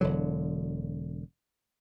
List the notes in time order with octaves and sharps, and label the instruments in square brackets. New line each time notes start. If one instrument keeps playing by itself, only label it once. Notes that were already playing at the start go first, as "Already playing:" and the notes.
[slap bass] E1 D3 F#3